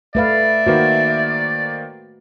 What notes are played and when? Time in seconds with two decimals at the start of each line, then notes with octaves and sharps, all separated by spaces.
0.15 A3 B4 D5 E5 F5
0.67 D#3 A#3 F#4 B4 C5